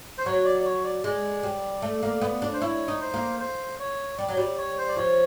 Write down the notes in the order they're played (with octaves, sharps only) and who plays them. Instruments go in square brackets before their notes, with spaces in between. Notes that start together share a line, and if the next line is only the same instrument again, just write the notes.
[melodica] C5
[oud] F#3 [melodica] C#5
[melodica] D5
D5
C#5
D5
[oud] G#3 [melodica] D5
[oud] G3
A3
A#3
B3
D4
[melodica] C5
[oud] E4 [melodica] C#5
[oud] D#4
[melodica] C5
[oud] A#3
[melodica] C5
C#5
[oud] G3 [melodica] D5
[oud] F#3
[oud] G3 [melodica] D5
[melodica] C#5
C5
D5
[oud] F3 [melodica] C#5